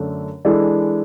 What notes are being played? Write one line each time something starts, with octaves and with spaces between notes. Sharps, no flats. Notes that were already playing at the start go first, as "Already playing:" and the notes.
Already playing: F#2 D3 A3 D4 A4
E3 G#3 D4 A4